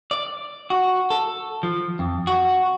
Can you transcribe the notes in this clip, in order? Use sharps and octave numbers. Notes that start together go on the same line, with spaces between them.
D5
F#4
A4
F3
F2
F#4